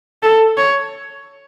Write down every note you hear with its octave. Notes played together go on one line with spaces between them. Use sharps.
A4
C#5